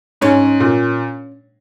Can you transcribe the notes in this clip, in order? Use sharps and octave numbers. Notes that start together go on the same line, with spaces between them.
G#2 C#4
A#2